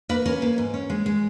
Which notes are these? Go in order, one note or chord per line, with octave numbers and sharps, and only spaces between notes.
A#3 B4
C#4 A#4
A#3
G#2
C#4
G#3
G#3